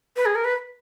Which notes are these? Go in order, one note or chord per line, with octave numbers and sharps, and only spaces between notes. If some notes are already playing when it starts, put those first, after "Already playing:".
B4
G#4
A#4
B4